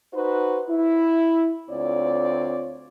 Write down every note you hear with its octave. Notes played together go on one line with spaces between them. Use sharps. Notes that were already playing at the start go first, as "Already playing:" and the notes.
D#4 F#4 B4 C5
E4
D2 C4 F4 C#5 D5